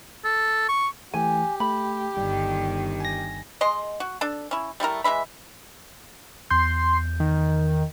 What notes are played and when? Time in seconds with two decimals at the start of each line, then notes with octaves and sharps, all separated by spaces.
0.25 A4
0.69 C#6
1.14 E3 A3 G4 G#5
1.60 A3 B5
2.17 G1 D#3 G3
3.00 G#5 A#6
3.61 G#3 D#5 C6
4.00 F#4
4.21 D4 A4
4.51 C#4 E4
4.80 G3 A3 E4 A#4
5.04 E3 G#3 E5 B5
6.51 E2 C6 G6
7.20 D#3